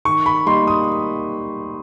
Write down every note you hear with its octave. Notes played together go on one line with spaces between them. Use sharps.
D#3 C#6
B5
G3 A#3 D#4 C6
D#6